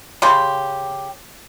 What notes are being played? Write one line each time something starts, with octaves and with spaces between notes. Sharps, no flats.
C#3 G4 C6